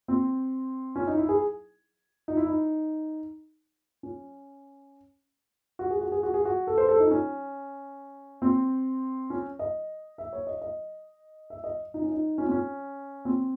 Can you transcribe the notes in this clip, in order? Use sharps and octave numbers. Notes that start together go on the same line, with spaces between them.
C4
C#4
D#4
E4
G#4
D#4
E4
D#4
C#4
F#4
G#4
F#4
G#4
F#4
G#4
F#4
A4
C5
A4
D#4
C#4
C4
C#4
D#5
E5
C#5
D#5
D#5
E5
D#5
D#4
C#4
D#4
C#4
C4
C#4
C4